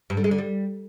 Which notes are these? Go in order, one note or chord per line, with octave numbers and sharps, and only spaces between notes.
G2
D3
G#3
D3
G3